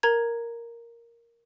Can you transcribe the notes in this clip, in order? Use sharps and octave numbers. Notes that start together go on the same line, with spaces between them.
A#4 A#5 G#6